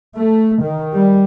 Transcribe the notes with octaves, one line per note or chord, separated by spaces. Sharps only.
A3
D#3
G3